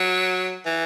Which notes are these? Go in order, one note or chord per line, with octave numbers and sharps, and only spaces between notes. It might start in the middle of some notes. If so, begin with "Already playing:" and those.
Already playing: F#3
E3